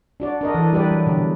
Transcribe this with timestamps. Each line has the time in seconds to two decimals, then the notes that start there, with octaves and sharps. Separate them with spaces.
0.20 D4 F#4 D5
0.41 D4 A#4 D#5
0.54 E3 A4
0.73 G3 G4 B4 D5
0.91 F#3
1.06 B2 D3